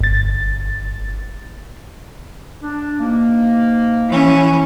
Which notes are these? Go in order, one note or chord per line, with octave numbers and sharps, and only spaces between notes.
G1 A6
D4
G#2 B2 A#3
E3 C#4